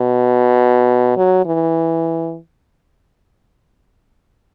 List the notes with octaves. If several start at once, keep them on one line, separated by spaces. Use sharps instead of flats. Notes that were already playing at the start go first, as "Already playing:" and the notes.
Already playing: B2
F#3
E3